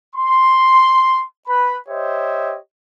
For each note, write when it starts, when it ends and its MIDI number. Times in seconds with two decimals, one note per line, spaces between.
0.15 1.23 84
1.47 1.77 71
1.47 1.77 83
1.88 2.57 67
1.88 2.57 72
1.88 2.57 73
1.88 2.57 75
1.88 2.57 76